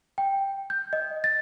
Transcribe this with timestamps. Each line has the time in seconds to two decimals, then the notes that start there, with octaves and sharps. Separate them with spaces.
0.18 G5
0.70 G6
0.93 D#5
1.24 A6